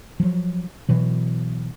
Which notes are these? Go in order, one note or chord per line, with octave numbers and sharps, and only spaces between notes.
F3 F#3
B2 E3 F#3